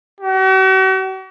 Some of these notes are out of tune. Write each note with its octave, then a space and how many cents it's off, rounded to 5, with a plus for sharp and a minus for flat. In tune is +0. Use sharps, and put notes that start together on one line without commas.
F#4 +45